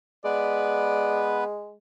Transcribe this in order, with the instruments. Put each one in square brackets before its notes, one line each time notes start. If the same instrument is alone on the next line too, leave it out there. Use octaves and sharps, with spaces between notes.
[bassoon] G#3 [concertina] B3 B4 [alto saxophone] D5